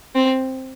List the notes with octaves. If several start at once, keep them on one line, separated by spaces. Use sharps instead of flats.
C4